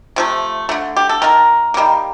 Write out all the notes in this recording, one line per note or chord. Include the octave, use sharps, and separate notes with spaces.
C3 F3 A3
D3 A3
G4
A4
D#3 A#3 A#4
D#3 G3 A#3